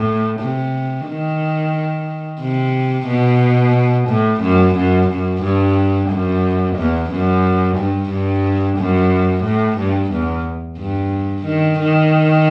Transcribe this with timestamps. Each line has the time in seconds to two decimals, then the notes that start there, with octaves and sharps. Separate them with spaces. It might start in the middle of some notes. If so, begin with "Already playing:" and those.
Already playing: A2
0.40 C3
1.07 D#3
2.41 C3
3.07 B2
4.08 A2
4.42 F#2
4.75 F#2
5.09 F#2
5.42 G2
6.09 F#2
6.77 E2
7.10 F#2
7.77 G2
8.10 G2
8.78 F#2
9.44 A2
9.77 G2
10.12 E2
10.79 G2
11.45 D#3
11.79 D#3